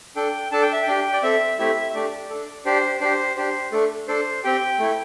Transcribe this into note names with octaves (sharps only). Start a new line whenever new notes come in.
D4 A4 G5
D4 A4 A5
G5
E5
G5
D4 G4
D5
C4 A4 E5
A3 C4 E4 G4 E5
E5
A3 D4 G4 D5
D4 A4
D4 G4 C5
D4 G4 C5
D4 G4 C5
A3 D4 A4
D4 A4 C5
C4 G4 G5
A3 E4 A4